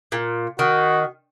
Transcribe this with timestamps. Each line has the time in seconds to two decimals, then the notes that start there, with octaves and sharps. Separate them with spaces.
0.12 A#2
0.59 D#3 F#4